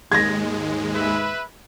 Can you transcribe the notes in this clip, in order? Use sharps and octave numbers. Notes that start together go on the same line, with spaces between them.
D#2 G#2 G#3 G#6 A#6
B4 E5